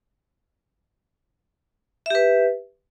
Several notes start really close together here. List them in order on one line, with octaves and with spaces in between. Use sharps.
E5 G4 B4